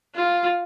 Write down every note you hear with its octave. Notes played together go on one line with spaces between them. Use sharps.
F4